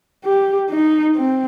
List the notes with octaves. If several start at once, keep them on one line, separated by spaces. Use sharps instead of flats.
G4
D#4
C4